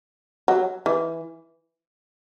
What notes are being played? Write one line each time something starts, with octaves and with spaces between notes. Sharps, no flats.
F#3
E3